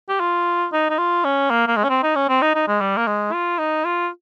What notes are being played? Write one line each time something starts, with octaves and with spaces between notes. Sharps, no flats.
G4
F4
D#4
D#4
F4
C#4
A#3
A#3
G#3
C#4
C4
D#4
C#4
C4
D#4
D#4
G#3
G3
A#3
G#3
F4
D#4
F4